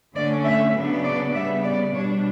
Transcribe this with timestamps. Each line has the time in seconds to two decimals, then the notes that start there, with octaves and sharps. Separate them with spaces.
0.15 D3 A3 C#4 D5
0.45 E5
0.74 C#3 F#3 B3 D4
1.04 D5
1.34 C#3 G3 B3 E5
1.63 D5
1.93 B2 G3 D4 C#5